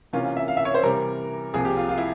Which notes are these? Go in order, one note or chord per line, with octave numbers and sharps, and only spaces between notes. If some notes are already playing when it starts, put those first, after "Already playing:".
C3 E3 A#3 C#4 F4
F4
E5
F5
E5
C#5
C5
C3 E3 G3 A#4
C2 C3 F3 A#3 G#4
G4
F4
F4
E4